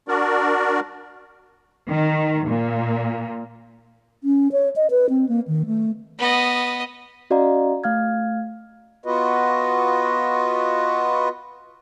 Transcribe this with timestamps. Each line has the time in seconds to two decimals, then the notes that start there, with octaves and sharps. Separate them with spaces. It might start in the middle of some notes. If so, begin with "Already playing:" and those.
0.08 D4 F#4 A#4 D5
1.89 D#3
2.49 A#2
4.22 C#4
4.52 C#5
4.76 D#5
4.90 B4
5.10 C4
5.29 A#3
5.48 D#3
5.66 A3
6.19 B3 D#5
7.30 C#4 F#4 D5 D#5 F5 A#5
7.84 A3 F5 F6 G#6
9.04 B3 F4 F#4 B4 D#5